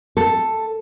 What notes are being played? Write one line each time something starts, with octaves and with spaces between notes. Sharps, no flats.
A4